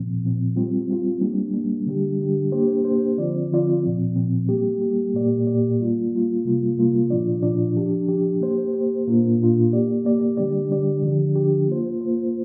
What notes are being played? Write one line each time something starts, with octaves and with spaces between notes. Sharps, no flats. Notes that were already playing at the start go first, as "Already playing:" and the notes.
Already playing: A#2 F3 C4
A#2 F3 C4
G3 C4 F4
G3 C4 F4
G3 A#3 D4
G3 A#3 D4
D3 G3 D4 G4
D3 G3 D4 G4
A#3 D4 G4 C5
A#3 D4 G4 C5
D3 F3 C4 F4 D5
D3 F3 C4 F4 D5
A#2 F3 C4
A#2 F3 C4
G3 A#3 G4
G3 A#3 G4
A#2 A#3 G4 D5
A#2 A#3 G4 D5
G3 A#3 F4
G3 A#3 F4
C3 G3 A#3 F4
C3 G3 A#3 F4
A#2 F3 D4 F4 D5
A#2 F3 D4 F4 D5
F3 D4 G4
F3 D4 G4
A#3 G4 C5
A#3 G4 C5
A#2 A#3 D4 F4
A#2 A#3 D4 F4
A#3 G4 D5
A#3 G4 D5
D3 G3 D4 G4 D5
D3 G3 D4 G4 D5
D3 F3 D4 G4
D3 F3 D4 G4
A#3 F4 C5
A#3 F4 C5